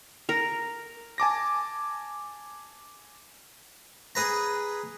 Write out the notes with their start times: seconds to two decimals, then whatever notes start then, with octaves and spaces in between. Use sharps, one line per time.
0.29 A#4
1.18 G#5 A5 D6 A#6
4.15 G#4 B4 A#5